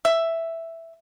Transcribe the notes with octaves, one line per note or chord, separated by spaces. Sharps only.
E5